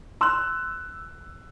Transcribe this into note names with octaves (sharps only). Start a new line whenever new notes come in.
A#5 C6 E6 F#6